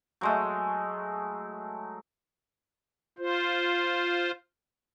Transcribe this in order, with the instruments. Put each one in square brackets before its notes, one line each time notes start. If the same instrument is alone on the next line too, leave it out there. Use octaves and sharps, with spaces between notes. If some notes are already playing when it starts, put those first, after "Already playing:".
[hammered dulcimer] F#3 G#3 A3
[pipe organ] F4 C5